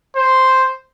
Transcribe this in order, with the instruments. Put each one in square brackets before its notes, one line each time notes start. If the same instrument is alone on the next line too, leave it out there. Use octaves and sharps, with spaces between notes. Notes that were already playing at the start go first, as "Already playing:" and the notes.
[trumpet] C5